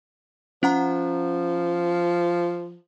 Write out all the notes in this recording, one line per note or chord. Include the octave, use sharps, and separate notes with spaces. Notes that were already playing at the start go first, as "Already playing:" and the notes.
F3 C#4 F#5 A#5